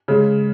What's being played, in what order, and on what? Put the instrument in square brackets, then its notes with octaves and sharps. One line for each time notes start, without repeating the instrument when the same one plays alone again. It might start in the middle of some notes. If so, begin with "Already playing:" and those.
[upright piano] C#3 G#3